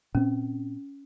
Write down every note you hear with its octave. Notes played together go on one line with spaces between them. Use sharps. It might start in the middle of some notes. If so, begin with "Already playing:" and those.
A#2 C4 C#4